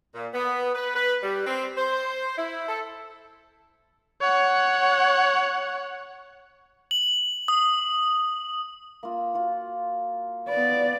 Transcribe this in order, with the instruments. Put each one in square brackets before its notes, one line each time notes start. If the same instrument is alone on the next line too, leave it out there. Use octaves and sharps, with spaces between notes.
[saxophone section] A#2
B3
B4
B4
G3
C4
C5
E4
A4
[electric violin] C#5 F#5
[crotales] F#7
D#6
[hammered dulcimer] A#3 F4
F4 F#4 F#5
[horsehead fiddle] B3 D5 [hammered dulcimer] B4